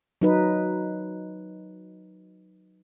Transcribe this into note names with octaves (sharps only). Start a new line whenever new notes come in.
F#3 D#4 B4